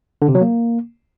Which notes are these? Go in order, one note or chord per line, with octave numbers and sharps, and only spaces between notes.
D3
C3
F#3
A#3